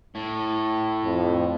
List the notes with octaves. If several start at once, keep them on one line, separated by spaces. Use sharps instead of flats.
A2
F2